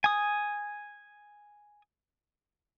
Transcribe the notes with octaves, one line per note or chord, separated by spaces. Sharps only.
G#5 D#6